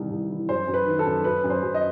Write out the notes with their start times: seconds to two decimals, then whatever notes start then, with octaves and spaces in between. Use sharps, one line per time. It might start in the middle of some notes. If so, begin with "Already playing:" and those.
Already playing: C2 D#3 E3
0.11 C2
0.30 E3
0.48 F#2 C5
0.68 F#2
0.74 B4
0.86 D#3
0.99 A4
1.06 F#2
1.24 F#2 B4
1.44 F#2
1.50 C5
1.63 F#2
1.74 D#5